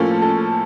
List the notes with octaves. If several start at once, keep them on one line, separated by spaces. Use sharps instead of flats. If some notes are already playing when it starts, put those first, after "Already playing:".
Already playing: A2 F3 A#3 C#4 A4
A4